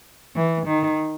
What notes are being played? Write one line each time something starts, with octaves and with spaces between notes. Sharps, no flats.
E3
D#3